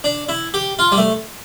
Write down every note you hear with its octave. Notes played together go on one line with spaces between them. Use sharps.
D4
E4
G4
F4
G3
A3